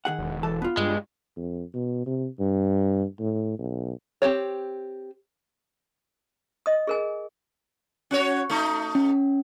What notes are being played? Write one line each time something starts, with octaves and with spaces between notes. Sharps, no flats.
D#3 G#4 F#5
E1
E3 A4 A5
B3 F4
G2 G#3
F2
B2
C3
G2
A2
B1
C4 G4 C#5
D#5 D#6
G#4 A#4 G#5
C#4 F#4 C#5
A3 D#4
C#4